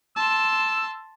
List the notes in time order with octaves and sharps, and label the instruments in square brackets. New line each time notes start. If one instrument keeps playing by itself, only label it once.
[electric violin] A5 C6 [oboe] E6